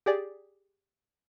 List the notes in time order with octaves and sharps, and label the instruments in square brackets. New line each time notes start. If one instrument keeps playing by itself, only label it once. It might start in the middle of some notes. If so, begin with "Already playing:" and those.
[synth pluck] G4 G#4 D5